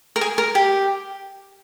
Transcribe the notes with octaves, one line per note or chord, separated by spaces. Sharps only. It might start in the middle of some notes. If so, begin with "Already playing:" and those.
A#4
G#4
A#4
G4